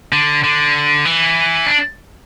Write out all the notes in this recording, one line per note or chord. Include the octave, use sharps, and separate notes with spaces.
D3
D3
E3
D4